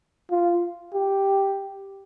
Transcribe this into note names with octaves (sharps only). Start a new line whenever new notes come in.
F4
G4